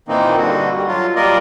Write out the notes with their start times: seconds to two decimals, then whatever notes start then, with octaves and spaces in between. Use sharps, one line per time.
0.08 A#2 D#3 E3 A#3 C4 D#4
0.37 G2 D3 F#4
0.73 G3
0.88 F#3 F4
1.16 G3 A#3 F4 A#4 D5 D#5